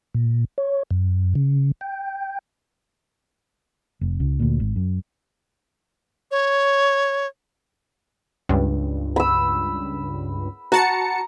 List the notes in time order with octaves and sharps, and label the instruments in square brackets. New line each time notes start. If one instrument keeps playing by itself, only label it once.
[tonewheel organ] A#2
C#5
F#2
C#3
G5
[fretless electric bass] F1
C#2
D2 A#2
G#1
F#2
[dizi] C#5
[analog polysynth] C#2 G2
[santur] B5 E6
[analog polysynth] F#4 A5 C#7 [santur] A#5